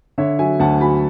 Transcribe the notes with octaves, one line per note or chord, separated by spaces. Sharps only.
D3 C#5 E5
F#3 E5 G#5
D2 F#5 A5
F#3 G#5 B5